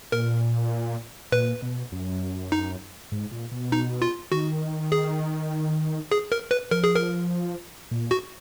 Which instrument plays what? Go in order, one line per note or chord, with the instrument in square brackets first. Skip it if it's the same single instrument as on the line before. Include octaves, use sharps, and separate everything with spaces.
[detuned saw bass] A#2 [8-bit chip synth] A#4
[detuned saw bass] A#2 [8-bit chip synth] B4
[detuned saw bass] B2
F#2
[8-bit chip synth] D#4
[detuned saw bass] G#2
A#2
B2
[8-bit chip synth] D#4
F4
[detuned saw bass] D#3 [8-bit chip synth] F#4
[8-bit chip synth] G#4
G#4
A#4
B4
[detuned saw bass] F3 [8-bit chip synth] A#4
[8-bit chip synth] G#4
A#4
[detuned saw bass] A#2
[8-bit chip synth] F#4